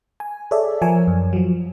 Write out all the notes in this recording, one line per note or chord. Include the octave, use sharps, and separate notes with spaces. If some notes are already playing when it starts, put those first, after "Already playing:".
G#5
G#4 A4 C#5 D5 E5
F3 A#4 C#5 G#5
F#2
F3 F#3